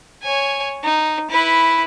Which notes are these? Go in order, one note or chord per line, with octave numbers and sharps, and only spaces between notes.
C#5 G#5
D#4
E4 B4